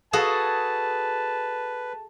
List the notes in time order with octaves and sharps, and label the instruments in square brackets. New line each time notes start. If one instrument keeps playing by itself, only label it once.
[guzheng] F#4 G#4 A4 [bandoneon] B4 [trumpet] A5